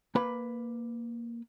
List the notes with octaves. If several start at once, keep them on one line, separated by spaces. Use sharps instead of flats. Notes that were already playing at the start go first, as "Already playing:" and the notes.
A#3 B4 B5